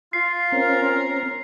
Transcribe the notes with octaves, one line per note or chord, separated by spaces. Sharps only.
F4 C7
C4 C#4 A#4